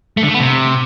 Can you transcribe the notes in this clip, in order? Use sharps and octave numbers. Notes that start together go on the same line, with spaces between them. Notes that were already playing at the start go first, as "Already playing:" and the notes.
A3
D3
A3
B3
C3